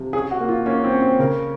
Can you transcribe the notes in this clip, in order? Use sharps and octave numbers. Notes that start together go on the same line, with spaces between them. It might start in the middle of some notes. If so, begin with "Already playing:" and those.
Already playing: C3 F3
C#4 G#4
F#4
A#3
F4
A#3 C#4
C4
C#4
C4
C#3 A#4